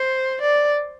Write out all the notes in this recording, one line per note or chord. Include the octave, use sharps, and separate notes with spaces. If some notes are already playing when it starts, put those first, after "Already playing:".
Already playing: C5
D5